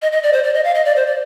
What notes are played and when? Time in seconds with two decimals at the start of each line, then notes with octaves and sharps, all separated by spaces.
0.02 D#5
0.12 D#5
0.23 D5
0.33 C5
0.44 D5
0.54 D#5
0.64 F5
0.75 D#5
0.85 D5
0.96 C5
1.07 D5